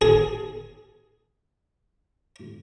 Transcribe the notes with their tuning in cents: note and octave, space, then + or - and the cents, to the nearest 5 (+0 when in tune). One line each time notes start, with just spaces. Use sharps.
G#4 +15